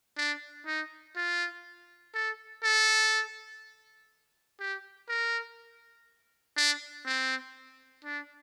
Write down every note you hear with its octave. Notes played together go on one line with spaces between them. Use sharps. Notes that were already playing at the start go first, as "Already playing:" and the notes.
D4
D#4
F4
A4
A4
G4
A#4
D4
C4
D4